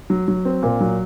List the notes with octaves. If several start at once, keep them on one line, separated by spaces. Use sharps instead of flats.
F#3
F#3
C4
A#2
F#3